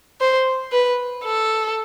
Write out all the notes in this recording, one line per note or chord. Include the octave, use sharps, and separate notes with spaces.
C5
B4
A4